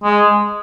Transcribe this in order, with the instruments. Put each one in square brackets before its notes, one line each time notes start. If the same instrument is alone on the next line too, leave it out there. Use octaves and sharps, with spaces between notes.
[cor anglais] G#3